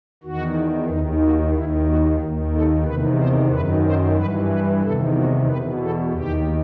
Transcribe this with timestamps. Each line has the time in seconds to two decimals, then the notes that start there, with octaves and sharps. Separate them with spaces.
0.23 E2 D#3 F#4
0.88 D#2 D#3 D#4
1.21 F#4
1.55 D#2 D#3 E4
1.87 F#4
2.19 D#2 D#3
2.53 A4
2.85 E2 C3 D#3 B4
3.18 C5
3.51 F#2 D#3 B4
3.84 C5
4.16 G2 E3 B4
4.50 B4
4.82 E2 C3 D#3 A4
5.15 F#4
5.47 E2 B2 B4
5.81 A4
6.13 D#2 D#3 G4